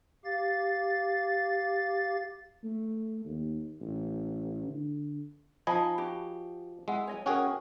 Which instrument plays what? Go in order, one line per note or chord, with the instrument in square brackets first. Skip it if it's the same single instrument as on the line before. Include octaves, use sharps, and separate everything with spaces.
[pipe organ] G4 F5 A6
[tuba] A3
D#2
A1
D3
[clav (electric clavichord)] F3 D#5 G#5 [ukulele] D#4 A5 B5
[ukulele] F#4 G4
[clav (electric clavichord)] G#3 [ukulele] E4 F#5
[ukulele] C#5 D#5 G#5
[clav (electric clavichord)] C#4 F#4 G#4 [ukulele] A#4 G5